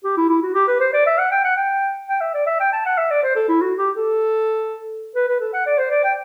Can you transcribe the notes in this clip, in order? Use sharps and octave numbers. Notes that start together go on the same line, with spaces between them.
G4
E4
E4
F#4
G4
B4
C5
D5
E5
F#5
G5
F#5
G5
G5
E5
D5
E5
G5
A5
F#5
E5
D5
C5
A4
E4
F#4
G4
A4
B4
B4
A4
F#5
D5
C5
D5
G5